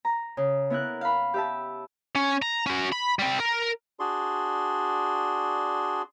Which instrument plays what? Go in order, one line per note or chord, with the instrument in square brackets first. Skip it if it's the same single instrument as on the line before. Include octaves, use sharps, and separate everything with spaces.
[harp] A#5
C#3
B3 E4 A#4 F#6
F5 B5
G4 E5 A5
[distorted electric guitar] C#4
A#5
C#4 F#4
B5
G3 C4
A#4
[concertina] D4 F#4 G#4 D5 C6